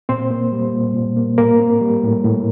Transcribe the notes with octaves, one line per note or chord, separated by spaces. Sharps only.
A#2 C4 C5
A#3
G3
A#2
A#2
A#3
A2 A#3 A#4
C4
G3
A2
A2